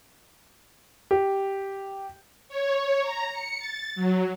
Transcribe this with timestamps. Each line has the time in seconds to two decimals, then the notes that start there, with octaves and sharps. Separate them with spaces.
1.11 G4
2.49 C#5
3.02 A#5
3.31 C#7
3.59 A6
3.95 F#3